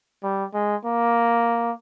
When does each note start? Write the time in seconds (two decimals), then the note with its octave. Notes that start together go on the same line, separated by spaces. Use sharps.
0.23 G3
0.54 G#3
0.85 A#3